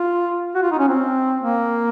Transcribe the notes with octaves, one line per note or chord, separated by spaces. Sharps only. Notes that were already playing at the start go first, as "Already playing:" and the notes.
Already playing: F4
F#4
F4
D#4
C#4
C4
A#3